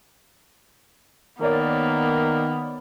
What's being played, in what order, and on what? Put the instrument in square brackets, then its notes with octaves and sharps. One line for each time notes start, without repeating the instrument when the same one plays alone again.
[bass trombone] D#3 [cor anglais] A#3 [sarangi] B3 [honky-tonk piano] A#4 C#5 D5